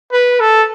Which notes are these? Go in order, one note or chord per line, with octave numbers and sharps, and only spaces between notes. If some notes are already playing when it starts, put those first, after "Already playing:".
B4
A4